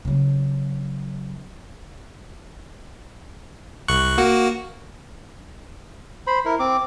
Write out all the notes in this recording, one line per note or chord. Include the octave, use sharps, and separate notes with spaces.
C#3 F#3
C2 C#6 F#6
A#3 F#4
C5 B5
E4 A#4
C4 D6